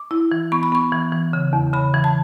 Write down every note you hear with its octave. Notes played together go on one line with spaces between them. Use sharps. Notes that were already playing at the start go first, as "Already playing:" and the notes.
Already playing: D6
E4
E3
B3 C#6
B5
B3 C#6
E3
E3
C#3
E2
C#3 B5
E3
A5